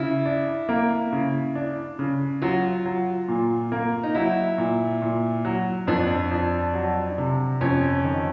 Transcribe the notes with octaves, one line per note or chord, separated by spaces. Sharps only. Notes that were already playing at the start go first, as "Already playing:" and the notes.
Already playing: C#3 E4
D4
A#3
C#3
D4
C#3
F#3 F4
F#3
A#2
A#3
D#4
F#3 E4
A#2
A#2
F#3
F2 D4
F2
F#3
C3
F2 C#4
D#3